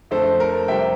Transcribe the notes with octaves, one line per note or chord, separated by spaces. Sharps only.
F2 D3 A3 C4 A4 C5
A#4
F2 C3 G3 C4 E5 G5